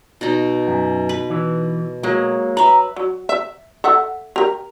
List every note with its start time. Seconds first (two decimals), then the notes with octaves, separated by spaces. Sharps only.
0.21 B2 D#4
0.68 F#2
1.09 B4
1.30 E3
2.03 F#3 G#3 A#3
2.57 B4 E5 A#5
2.96 F#3
3.29 E5
3.84 A4 E5 F#5
4.36 G4 A#4